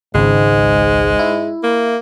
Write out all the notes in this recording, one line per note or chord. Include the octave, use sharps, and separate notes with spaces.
G#1 C#2 G#2 G#3
E4
A#3